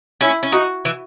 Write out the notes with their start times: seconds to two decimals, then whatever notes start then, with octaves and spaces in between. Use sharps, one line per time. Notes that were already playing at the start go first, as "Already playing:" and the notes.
0.21 C#4 E4
0.43 C#4
0.52 D#4 F#4
0.85 E3